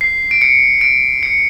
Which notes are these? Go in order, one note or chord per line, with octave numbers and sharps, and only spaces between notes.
C7
D7
C#7
D7
C#7